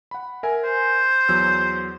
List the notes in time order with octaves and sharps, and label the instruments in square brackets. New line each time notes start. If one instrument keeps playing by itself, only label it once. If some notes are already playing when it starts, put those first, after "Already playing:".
[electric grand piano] F#5 B5
A#4 E5 G#5
[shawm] C5
[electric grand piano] E2 F#3 E6